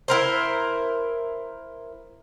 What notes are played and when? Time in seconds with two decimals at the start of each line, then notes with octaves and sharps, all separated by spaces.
0.08 E4 A#4 C5